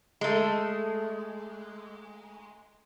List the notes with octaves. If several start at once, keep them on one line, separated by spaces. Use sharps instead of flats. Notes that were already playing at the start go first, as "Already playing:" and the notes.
G#3 A3